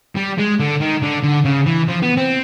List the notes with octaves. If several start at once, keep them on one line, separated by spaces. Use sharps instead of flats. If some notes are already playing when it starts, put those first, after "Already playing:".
G3
G#3
D3
D#3
D3
D3
C#3
E3
F3
B3
C4